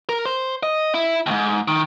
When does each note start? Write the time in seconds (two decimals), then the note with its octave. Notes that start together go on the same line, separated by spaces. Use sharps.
0.09 A#4
0.25 C5
0.63 D#5
0.94 E4
1.26 D#2 G#2
1.68 D#3